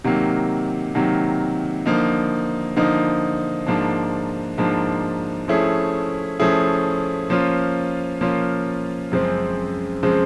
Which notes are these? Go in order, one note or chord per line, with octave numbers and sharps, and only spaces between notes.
C3 D#3 F#3 A#3
C3 D#3 F#3 A#3
D3 F3 A#3 D#4
D3 F3 A#3 D#4
G#2 F3 A#3 D4
G#2 F3 A#3 D4
F3 A3 C#4 E4 G#4
F3 A3 C#4 E4 G#4
F3 A#3 C#4 F4
F3 A#3 C#4 F4
F#2 C#3 F3 G#3 C4
C#3 F3 G#3 C4